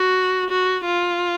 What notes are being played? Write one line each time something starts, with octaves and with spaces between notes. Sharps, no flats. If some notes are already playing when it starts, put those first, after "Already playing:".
Already playing: F#4
F#4
F4